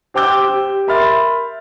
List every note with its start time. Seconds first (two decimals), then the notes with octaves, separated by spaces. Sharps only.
0.14 G4 C5 G5 D6 E6 G6
0.48 G4
0.87 A#4 E5 B5 C6 F6 A6